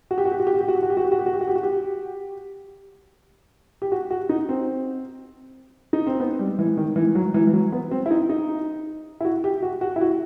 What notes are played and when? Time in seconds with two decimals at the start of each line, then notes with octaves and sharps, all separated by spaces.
0.11 F#4
0.18 G4
0.25 F#4
0.32 G4
0.40 F#4
0.47 G4
0.54 F#4
0.61 G4
0.68 F#4
0.75 G4
0.83 F#4
0.90 G4
0.97 F#4
1.05 G4
1.12 F#4
1.19 G4
1.26 F#4
1.34 G4
1.41 F#4
1.48 G4
1.56 F#4
1.63 G4
3.82 G4
3.92 F#4
4.11 F#4
4.29 D#4
4.49 C4
5.93 D#4
6.07 C4
6.20 B3
6.39 G3
6.59 E3
6.77 D#3
6.96 E3
7.15 F#3
7.34 E3
7.47 E3
7.53 F#3
7.72 B3
7.91 C4
8.06 E4
8.11 D#4
8.29 D#4
9.21 E4
9.25 F#4
9.44 G4
9.63 F#4
9.81 F#4
9.96 E4
10.01 F#4